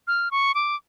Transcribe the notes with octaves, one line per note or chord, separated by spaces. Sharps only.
F6
C#6
D6